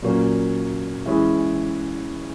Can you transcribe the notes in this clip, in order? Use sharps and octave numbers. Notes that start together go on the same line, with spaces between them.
A#2 F#3 A#3 C#4
E3 G#3 C#4 E4 G#4